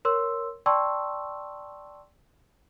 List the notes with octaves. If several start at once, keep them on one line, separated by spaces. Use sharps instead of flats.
A#4 C#5 C6 E6
D5 G5 A5 C6 C#6 E6